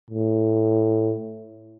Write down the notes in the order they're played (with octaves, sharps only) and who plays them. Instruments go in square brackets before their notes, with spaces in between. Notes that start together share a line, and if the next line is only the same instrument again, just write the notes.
[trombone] A2